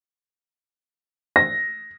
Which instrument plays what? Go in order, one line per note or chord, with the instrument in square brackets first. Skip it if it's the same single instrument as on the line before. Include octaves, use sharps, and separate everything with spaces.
[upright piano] A#6